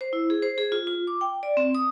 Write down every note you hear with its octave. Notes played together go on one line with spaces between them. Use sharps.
C5
E4
G#4
C5
G#4
F4
F4
D6
G5
D5
C4
D#6